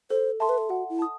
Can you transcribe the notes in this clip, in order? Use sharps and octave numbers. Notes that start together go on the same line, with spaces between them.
A4 C5
A4 E5 A5 C6
B4
A4
F#4 F#5
E4
A5 D#6